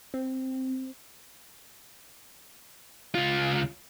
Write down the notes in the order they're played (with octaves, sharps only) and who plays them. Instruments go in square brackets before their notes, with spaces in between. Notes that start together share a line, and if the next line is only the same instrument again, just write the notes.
[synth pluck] C4
[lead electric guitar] C#2 F4